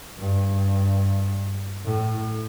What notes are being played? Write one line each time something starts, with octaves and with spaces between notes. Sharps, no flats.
G2
A2